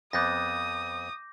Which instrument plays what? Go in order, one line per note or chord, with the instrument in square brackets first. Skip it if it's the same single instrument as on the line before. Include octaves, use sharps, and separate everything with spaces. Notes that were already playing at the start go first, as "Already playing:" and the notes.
[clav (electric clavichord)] F2 B3 [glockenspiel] D6 G6 A#6 [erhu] D#6